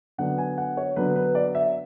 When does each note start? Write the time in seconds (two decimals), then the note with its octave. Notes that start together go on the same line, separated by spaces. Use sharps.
0.18 D3 F#3 B3 D4 F#5
0.38 G#5
0.58 F#5
0.77 C#5
0.96 D3 F#3 B3 D4 B4
1.16 B4
1.35 D5
1.55 E5